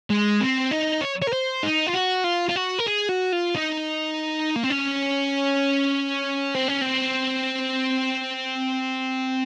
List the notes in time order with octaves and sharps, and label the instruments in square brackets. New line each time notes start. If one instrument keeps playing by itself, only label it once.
[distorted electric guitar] G#3
C4
D#4
C#5
C#5
A#4
C5
D#4
F4
F#4
F4
F4
F#4
A#4
G#4
F#4
F4
D#4
A#3
C4
C#4
C4
C#4
C4